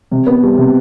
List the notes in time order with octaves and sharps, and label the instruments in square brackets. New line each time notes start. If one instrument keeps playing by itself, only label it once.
[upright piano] C3
B3
G3
C3